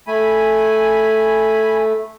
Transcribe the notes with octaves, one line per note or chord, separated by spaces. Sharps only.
A3 G#5 B5